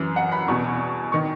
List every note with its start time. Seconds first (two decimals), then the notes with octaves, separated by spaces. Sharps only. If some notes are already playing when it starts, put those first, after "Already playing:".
Already playing: F#2 E3
0.16 F#5
0.32 B5
0.48 E2 B2 C#6
1.12 D#3 C#6